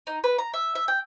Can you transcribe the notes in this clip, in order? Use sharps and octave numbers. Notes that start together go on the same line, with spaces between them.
D#4
B4
A#5
E5
E5
G5